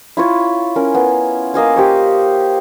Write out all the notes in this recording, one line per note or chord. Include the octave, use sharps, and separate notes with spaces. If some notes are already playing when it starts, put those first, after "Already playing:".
E4 F4 C#5
C#4 A#4
B3
A#3 D#5 F5 G#5
G4 C5 C#5